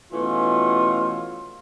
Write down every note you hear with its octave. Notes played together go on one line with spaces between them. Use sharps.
B2 E3 A3 C#4 F4